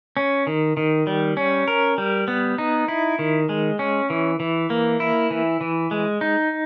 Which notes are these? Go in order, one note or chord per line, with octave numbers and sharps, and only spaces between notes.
C#4
D#3
D#3
G3
C#4
A#4
G3
B3
D#4
E4
D#3
G#3
C#4
E3
E3
A#3
E4
E3
E3
G#3
D#4